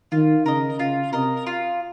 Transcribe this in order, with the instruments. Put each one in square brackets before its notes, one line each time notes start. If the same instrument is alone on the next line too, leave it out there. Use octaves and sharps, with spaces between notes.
[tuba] D#3 [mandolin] F4
[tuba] C#3 [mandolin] A#4 D#5
[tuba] C#3 [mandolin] F4
[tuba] C3 [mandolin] A#4 D#5
[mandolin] F4